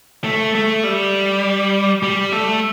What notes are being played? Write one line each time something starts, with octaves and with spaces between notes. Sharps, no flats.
A3
A3
G3
G3
A3